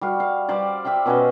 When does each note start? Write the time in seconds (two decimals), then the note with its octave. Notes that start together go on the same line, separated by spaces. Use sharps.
0.01 G3 F#4 F5
0.20 F5
0.49 G3 G4 C5 D5
0.85 G4 E5 F5 G5
1.06 B2 C#4 B4 D#5